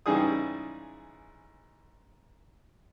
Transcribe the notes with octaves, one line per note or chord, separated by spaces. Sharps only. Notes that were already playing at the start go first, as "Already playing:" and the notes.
G#2 C#3 E3 G3 G#4 D#6